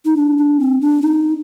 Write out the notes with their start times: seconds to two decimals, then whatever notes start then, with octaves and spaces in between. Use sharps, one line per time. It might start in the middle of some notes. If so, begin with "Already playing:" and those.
0.05 D#4
0.17 D4
0.38 D4
0.60 C4
0.81 D4
1.02 D#4